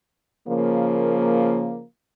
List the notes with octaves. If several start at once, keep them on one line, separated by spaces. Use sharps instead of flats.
C#3 F3 A#3